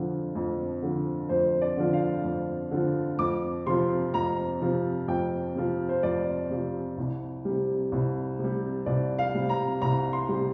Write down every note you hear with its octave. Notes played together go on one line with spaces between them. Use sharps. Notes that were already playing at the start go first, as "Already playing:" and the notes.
Already playing: F2 D3 F3
F2
D3 F3
F2 C5
D5
D3 F3
F5
F2
D3 F3
F2 D6
C3 F3 C6
F2 A#5
C3 F3
F2 G5
C3 F3
C5
F2 D5
C3 F3
C2
C3 G3
C2
C3
G3
C2 D5
F5
C3 G3
A#5
C2 A#5
C6
C3 G3